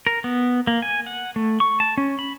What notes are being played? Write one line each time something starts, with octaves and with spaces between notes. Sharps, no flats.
A#4
B3
A#3
G#5
F#5
A3
C#6
A5
C#4
B5